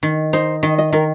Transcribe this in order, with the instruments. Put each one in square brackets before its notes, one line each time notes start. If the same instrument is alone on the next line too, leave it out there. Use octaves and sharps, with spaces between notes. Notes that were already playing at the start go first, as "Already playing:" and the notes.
[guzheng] D#3
[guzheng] D#4 [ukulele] C5
[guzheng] D#3 [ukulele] D#5
[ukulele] D#5
[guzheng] D#3 [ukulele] A#4